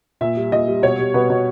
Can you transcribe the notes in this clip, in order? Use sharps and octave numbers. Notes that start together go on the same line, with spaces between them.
A#2 E5
G3
A#2 D#5
G3
B2 C#5
G3
B2 B4
B2